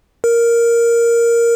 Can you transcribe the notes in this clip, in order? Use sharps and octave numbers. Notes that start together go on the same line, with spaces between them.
A#4